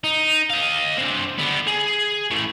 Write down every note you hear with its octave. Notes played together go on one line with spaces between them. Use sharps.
D#4
D#5 F5
C4 D4
D3 B3
G#4
E3 A3